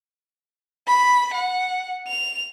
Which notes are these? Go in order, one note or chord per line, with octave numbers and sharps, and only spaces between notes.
B5
F#5
F7